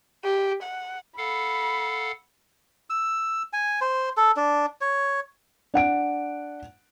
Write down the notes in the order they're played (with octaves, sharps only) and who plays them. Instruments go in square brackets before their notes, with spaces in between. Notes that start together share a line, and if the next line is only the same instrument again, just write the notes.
[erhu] G4
F#5
[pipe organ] A4 F5 F#5 [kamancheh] B5
[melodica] E6
G#5
C5
A4
D4
C#5
[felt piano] D4 F#5 D7